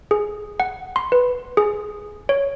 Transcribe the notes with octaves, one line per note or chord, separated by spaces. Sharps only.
G#4
F#5
C6
B4
G#4
C#5